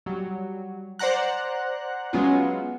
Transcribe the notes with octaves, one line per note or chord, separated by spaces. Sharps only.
F#3 G3
C5 D5 F#5 A#5 F#6
F#3 G#3 B3 C#4 F4 F#4